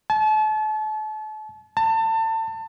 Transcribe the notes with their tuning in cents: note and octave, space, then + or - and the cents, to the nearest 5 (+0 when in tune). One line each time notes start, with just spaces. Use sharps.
A5 -35
A5 +30